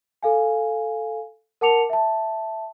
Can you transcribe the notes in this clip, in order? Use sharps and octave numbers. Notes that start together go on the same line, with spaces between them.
A4 F5 G#5
A#4 F#5 A5 D6 C#7 F7
E5 A5